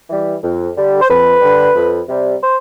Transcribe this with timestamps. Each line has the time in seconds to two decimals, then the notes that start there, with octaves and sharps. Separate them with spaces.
0.09 E3 G3
0.43 F2
0.76 D3 G3
1.01 C5
1.09 F2 B4
1.41 D3 G3
1.75 F2
2.08 C3 G3
2.41 C5